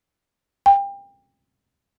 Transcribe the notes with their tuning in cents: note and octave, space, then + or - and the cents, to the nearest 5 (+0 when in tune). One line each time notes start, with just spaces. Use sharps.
G5 +25